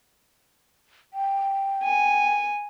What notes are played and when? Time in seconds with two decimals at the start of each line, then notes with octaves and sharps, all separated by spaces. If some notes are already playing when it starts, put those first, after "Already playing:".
1.14 G5
1.83 G#5